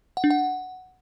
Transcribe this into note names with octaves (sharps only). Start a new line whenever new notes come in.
F#5
D4
F#5